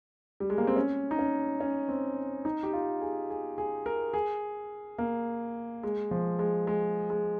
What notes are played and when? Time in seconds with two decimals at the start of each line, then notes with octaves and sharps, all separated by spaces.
0.40 G3
0.50 G#3
0.58 A#3
0.67 C4
0.76 C#4
1.11 D#4
1.19 C#4
1.61 C#4
1.89 C4
2.45 D#4
2.63 G4
2.73 F4
3.01 G#4
3.30 G#4
3.58 G#4
3.86 A#4
4.14 G#4
4.98 A#3
5.83 G#3
6.11 F3
6.39 G#3
6.67 G#3
7.10 G#3